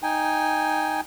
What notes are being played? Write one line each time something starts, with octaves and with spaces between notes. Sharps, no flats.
D#4 G5 G#5